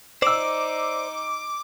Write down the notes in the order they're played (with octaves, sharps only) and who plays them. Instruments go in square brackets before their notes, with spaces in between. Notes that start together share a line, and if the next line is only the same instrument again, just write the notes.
[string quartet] D#4 [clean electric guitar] C5 D5 [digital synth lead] D6 [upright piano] E6 E7